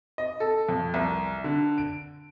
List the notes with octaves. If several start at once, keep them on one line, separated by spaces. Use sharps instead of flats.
D#5
A4
F2
C2
D3
D7